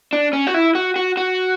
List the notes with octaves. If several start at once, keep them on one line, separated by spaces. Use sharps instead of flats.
D4
C#4
F#4
E4
F#4
F#4
F#4